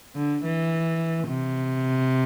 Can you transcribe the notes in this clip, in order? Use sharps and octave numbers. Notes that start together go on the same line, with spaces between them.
D3
E3
C3